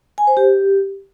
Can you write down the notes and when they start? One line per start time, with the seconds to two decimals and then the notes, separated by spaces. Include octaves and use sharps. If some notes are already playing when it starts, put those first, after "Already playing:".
0.18 G#5
0.27 C5
0.37 G4